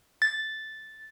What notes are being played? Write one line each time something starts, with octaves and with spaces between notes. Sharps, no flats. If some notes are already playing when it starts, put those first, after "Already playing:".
A6